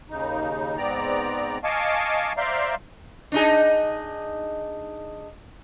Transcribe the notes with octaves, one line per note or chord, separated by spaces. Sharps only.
D#2 C#3 D#4
G#2 B3 C4 D5 A#5
D#5 F5 G#5 A5 C#6 D6
C5 D5 E5 F5 A#5 C6
D4 D#4 G#4